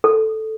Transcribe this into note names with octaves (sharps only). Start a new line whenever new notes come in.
A4